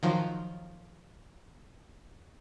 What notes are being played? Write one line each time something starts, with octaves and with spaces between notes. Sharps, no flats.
D#3 F3 F#3